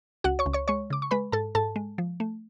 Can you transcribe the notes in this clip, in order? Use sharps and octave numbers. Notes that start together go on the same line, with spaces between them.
C#2 F#4 F#5
C#5 C#6
C#2
C#5 C#6
G#3 C#5 C#6
C#3 D6
C#6
G#3 B4 B5
G#2 A4 A5
G#2 A4 A5
G#3
F3
A3